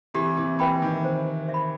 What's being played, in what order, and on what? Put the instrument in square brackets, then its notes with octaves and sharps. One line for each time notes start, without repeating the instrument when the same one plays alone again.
[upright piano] C3 E3 [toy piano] G4
[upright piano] C3 E3
[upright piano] C3 E3 [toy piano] B4 E5 G5 B5
[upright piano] D#3
[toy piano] C5
E5
B5